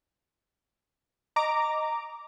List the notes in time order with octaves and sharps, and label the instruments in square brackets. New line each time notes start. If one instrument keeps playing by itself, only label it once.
[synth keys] D#5 A#5 D6